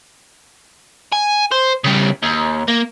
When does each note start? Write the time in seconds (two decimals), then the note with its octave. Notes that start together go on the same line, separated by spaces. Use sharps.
1.13 G#5
1.51 C5
1.84 C#3 G3
2.23 D#2
2.68 A#3